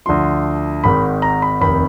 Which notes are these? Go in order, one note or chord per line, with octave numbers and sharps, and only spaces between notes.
D2 D3 F3 C6
G#1 G#2 D#3 B5
A#5
B5
F1 D#2 D#3 B5